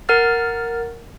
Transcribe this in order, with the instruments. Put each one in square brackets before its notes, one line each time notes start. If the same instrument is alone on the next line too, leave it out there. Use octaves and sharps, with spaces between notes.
[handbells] A#4 F#5 F6 A6